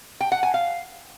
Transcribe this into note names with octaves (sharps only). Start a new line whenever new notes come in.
G5
F#5
G#5
F5